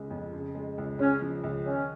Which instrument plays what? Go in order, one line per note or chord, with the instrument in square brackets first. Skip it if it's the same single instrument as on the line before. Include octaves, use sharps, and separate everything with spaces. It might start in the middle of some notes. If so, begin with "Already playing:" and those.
Already playing: [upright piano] C#2 C#3 G#3
F2
C#3
G#3
C#2
[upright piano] C#3 [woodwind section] C#4
[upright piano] F3
C#2
[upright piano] D#3 [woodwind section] C#4